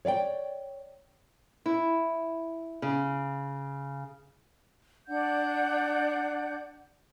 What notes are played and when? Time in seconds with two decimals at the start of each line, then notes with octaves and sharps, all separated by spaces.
0.05 C#5 D5 F5 G5
1.66 E4
2.82 C#3
5.08 D4 D5 F#5 G6